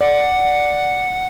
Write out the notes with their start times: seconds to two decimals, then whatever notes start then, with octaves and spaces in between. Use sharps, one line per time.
0.01 D5 F#5